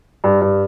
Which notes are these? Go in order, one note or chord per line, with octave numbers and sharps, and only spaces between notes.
G2
G2